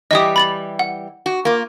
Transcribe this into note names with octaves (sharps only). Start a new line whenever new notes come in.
E3 G3 G4 D#5 D#6
B5 A6 F#7
F#5
F#4
A#3 F4